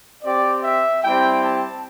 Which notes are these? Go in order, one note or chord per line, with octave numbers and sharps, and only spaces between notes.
C4 G4 D5
E5
G3 C4 E4 G4 G5
A5